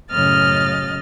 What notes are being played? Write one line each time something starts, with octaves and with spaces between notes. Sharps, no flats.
F#2 A2 C#3 D#5 F6 A6